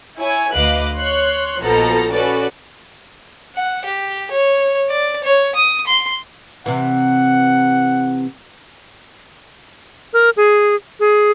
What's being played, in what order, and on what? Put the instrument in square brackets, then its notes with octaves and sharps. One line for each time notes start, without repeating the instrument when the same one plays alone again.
[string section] E4 C#5 G#5
D2 B4 D#5 F5 D6 F#6
C#5 C6 F#6
A#1 B2 F3 A4 A#5
C#4 F#4 A4 B4 D5
[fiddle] F#5
G4
C#5
D5
C#5
D#6
C6
[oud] C3 E3 [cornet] F#5
[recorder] A#4
G#4
G#4